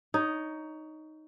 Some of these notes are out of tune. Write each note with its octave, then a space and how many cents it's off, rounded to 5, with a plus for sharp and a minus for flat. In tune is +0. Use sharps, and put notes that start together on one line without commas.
D#4 +0 C#5 +20